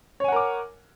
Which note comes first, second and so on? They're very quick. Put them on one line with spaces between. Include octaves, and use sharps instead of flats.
C#5 G#5 F#5 A#4 D6